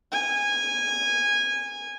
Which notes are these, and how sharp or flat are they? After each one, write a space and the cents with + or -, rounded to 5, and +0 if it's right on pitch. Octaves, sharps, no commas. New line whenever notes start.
G#5 -15